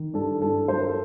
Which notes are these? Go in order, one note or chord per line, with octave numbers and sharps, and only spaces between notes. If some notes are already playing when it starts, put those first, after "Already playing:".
Already playing: D#3
G2 A4
G2 A4
F#3 C5
A#4
A4